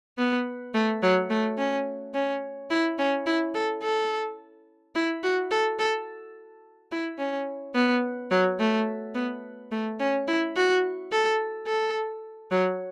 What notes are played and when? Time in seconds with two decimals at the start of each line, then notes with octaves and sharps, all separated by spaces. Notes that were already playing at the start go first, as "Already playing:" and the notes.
0.18 B3
0.74 A3
1.03 F#3
1.30 A3
1.58 C#4
2.14 C#4
2.70 E4
2.99 C#4
3.26 E4
3.55 A4
3.83 A4
4.95 E4
5.24 F#4
5.51 A4
5.79 A4
6.92 E4
7.19 C#4
7.75 B3
8.31 F#3
8.59 A3
9.15 B3
9.71 A3
10.00 C#4
10.28 E4
10.56 F#4
11.12 A4
11.67 A4
12.52 F#3